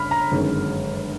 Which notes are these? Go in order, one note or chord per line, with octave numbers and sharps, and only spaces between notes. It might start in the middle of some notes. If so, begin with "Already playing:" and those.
Already playing: G1 C#3 B5 F6
A#5
G1 F#2 D#3 G#3